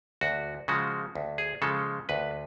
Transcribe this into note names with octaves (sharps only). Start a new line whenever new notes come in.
D2 F#4
C#3 F3 G#3 F#4
D2
G#4
C#3 F3 G#3 A4
D2 B4